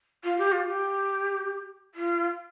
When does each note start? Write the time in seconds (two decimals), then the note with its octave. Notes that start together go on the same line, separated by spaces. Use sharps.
0.23 F4
0.37 G4
0.51 F4
0.66 G4
1.94 F4